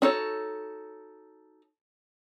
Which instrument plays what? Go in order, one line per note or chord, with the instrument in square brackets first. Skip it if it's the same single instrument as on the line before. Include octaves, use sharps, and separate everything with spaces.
[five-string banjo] D4 D#4 F#4 A4 C#5